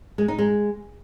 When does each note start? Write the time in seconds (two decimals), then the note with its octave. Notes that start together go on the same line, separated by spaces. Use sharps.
0.18 G#3
0.28 D#4
0.38 G#3